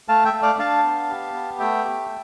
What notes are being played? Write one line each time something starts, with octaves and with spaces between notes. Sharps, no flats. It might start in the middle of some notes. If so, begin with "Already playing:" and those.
A3 F5 A5
E5 G5
A3
D5 F5
D4 F5 A5
B3
G4
B3
A3 E5 G5
G4